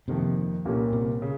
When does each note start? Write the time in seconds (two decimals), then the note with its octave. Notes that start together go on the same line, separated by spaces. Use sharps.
0.08 F2 C3 D#3 A#3 D#4
0.65 C2 A#2 G3 A#3 C#4
0.93 C3
1.22 C#3